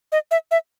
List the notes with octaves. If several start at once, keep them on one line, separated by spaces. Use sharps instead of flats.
D#5
E5
E5